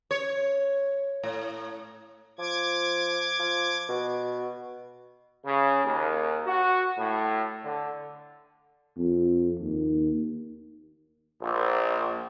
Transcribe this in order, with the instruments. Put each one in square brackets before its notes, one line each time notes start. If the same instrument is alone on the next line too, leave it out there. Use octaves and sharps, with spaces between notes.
[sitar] C#5
A2
[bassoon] F3 [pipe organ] D6 G#6
[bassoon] F3
B2
[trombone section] C#3
D#2
F#4
A2
D3
[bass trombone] F2
D#2
[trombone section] A#1